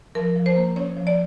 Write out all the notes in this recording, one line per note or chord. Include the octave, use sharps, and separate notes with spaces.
F3 A#4
F3
C5
A#3
C#4 C#5
F3
D5